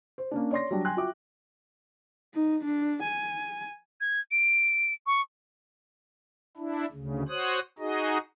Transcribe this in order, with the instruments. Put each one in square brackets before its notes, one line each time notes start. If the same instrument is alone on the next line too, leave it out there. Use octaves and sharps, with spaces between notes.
[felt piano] C5
A#3 C#4 D4
C#5 D5 C6 A#6
F#3 G3 D4
G5 G#5 C6 F#6
F4 F#4 E5 G5 D6
[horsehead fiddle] D#4
D4
G#5
[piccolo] G#6
D7
C#6
[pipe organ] D4 E4
D2 C#3
F#4 C5 C#5 D#6 F#6
D#4 F#4 G#4 D#5